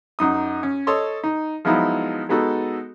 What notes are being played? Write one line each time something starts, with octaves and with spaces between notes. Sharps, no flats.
F#2 D#4 D#6
C#4
A4 C#5 D#5 C6 C#6
D#4
F3 F#3 G#3 B3 D#4 E4
G#3 B3 D#4 F#4 A4